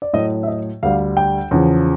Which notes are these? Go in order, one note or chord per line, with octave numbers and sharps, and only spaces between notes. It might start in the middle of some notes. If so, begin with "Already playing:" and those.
D5
A2 F#3 D#5
E5
D#5
D2 D3 G3 F5
G5
E2 C#3 F3